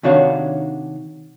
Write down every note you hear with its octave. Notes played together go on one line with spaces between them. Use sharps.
C3 D#3 D4 F#4 C#5 F5